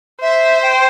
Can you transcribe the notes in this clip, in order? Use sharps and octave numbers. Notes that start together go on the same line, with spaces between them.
C5 E5
G5